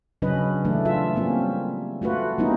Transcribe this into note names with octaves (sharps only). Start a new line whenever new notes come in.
C#3 F#3 C#4 D4 B4 D#5
E3 A3 D4
F4 G#4 E5
G3 A#3 C4 C#4
A3 F4 F#4 B4
G3 A#3 B3 C#4 D#4 E4